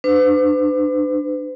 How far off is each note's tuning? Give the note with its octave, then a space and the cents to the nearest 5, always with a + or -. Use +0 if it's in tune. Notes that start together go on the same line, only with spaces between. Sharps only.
D4 +25 B4 +45